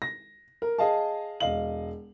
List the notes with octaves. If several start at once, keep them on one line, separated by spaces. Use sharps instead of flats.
A#6
A#4
G#4 D#5 F5 A5
E1 D#5 F5 F#7